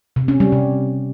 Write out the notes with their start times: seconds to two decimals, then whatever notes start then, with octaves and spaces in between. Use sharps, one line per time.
0.16 C3
0.28 C#4
0.40 G3
0.52 C3